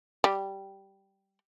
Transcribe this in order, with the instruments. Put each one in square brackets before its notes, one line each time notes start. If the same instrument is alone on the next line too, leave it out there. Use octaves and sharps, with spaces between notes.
[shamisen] G3